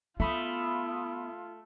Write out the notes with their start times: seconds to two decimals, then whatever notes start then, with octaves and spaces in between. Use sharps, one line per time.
0.20 A3 B3 F4 E5 B5 D#6